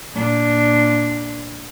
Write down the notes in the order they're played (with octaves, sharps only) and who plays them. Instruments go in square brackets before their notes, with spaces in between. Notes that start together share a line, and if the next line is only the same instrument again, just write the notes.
[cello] A#2 D4